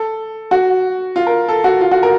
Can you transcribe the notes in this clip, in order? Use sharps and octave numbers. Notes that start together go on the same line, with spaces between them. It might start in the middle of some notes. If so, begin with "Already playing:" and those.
Already playing: A4
F#4
F4
A#4
A4
F#4
F4
F#4
A#4